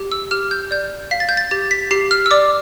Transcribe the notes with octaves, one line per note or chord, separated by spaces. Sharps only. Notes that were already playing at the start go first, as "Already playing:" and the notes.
Already playing: G4
E6
G4 F6
G6
D5 G6
F5 B6
A6
G6
A6
G4 A6
B6
G4 C7
F6
E6
D5 D6